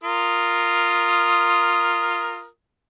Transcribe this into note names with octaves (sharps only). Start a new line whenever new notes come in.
F4 A#4 D#6